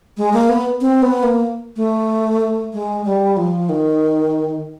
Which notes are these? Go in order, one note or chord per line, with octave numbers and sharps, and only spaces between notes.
G#3
A#3
B3
C4
B3
A#3
A3
G#3
G3
F3
D#3